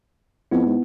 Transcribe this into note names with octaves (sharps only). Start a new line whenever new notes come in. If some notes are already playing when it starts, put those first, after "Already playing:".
F2 B3 E4
G#2